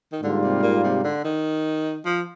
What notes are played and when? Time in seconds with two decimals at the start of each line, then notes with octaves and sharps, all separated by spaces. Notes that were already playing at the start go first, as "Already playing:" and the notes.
0.12 D#3
0.22 G#2 D3 G3 A#3 F4
0.42 C3
0.62 A#2
0.84 C3
1.04 D3
1.24 D#3
2.05 F3